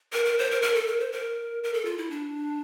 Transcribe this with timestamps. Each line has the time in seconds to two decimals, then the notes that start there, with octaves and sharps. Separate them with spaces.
0.13 A#4
0.25 A#4
0.39 C5
0.51 A#4
0.62 A#4
0.75 A4
0.87 A#4
1.00 C5
1.12 A#4
1.64 A#4
1.74 A4
1.85 F4
1.98 E4
2.10 D4